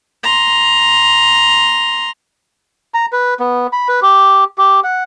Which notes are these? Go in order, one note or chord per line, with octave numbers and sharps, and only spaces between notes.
A#5 C6
A#5
B4
B3
B5
B4
G4
G4
F#5